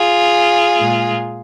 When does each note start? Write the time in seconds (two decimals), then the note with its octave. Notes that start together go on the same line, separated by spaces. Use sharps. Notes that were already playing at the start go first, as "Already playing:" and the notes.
Already playing: F4 G#4
0.78 A#2 G#3